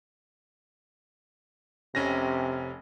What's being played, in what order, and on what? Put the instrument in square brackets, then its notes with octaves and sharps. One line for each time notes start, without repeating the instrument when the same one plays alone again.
[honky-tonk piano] F1 C#4 A#6 [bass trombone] C3